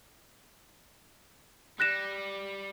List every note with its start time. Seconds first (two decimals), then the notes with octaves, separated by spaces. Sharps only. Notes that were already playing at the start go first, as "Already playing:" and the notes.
1.80 G3 F#6 A#6 E7